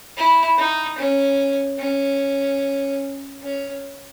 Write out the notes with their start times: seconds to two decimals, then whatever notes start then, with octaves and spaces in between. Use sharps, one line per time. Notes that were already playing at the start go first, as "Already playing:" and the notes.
0.17 E4
0.58 D#4
0.98 C#4
1.79 C#4
3.42 C#4